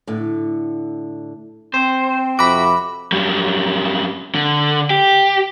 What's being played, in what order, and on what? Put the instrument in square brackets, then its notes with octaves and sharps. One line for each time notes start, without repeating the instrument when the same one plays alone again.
[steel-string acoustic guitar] A2 D3
[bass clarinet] C4 [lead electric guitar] C5
[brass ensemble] F2 C3 E5 [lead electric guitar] F#4 [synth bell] B5 D6
[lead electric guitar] F#2 G3
D3
G4